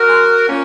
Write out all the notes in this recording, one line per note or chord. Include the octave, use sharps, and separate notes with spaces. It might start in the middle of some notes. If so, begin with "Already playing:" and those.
Already playing: F#4 A#4
G#3
A#2 A#3 C#4